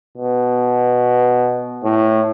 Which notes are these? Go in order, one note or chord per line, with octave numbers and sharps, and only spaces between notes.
B2
A2